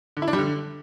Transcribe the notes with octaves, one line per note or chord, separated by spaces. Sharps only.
D3
E4
D4
G3
D3